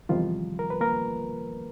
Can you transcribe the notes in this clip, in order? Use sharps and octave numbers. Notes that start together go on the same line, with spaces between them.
E2 C3 D#3 F3 G3 F4
A#4
B4
A#3 A#4